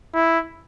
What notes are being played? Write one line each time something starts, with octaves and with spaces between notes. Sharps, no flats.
E4